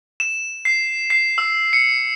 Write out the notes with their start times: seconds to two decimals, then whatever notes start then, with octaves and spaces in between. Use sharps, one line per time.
0.20 E7
0.65 C7
1.10 C7
1.38 E6
1.73 C#7